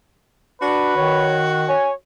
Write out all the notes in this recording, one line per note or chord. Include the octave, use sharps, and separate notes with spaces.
D4 F#4 B4
D#3 C#5
C#5 G#5